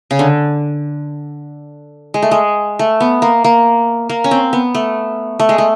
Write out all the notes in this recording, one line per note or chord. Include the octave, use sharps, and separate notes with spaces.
C#3
D3
G#3
A3
G#3
A3
B3
A#3
A#3
A#3
C#4
C4
B3
A3
A3
G#3
A3